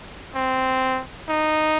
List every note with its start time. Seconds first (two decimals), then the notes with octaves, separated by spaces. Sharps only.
0.35 C4
1.29 D#4